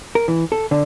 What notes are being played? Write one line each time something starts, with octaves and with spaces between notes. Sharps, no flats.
A#4
E3
A4
D3